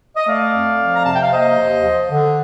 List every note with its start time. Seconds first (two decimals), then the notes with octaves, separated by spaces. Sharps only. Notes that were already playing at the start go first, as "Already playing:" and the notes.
0.16 D#5
0.27 A3 D5 F5
0.54 F2
0.80 F3
0.96 A#5
1.05 C3 A5
1.14 G5
1.23 F5
1.32 A#3 C5 D#5
1.58 D#2
1.85 F3
2.11 D3